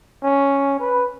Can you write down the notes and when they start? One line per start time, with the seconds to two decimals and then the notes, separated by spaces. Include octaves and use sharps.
0.23 C#4
0.80 B4